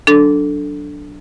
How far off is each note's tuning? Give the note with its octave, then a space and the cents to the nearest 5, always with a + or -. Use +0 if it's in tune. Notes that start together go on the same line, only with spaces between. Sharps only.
F#3 +0 D4 -5 A4 +0